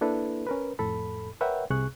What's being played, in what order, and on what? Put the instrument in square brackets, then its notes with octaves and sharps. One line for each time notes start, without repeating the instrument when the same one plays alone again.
[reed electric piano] A#3 D4 E4 A4 B4
C#4 A#4 B4
F2 A2 A4 B5
A#4 B4 C#5 E5 F#5 G5
C2 C3 G#4 C#6 F#6